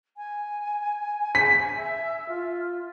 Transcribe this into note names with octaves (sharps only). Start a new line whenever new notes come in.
G#5
B6
E5
F4